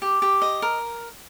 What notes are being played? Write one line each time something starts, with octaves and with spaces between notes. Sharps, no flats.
G4
G4
D#5
A#4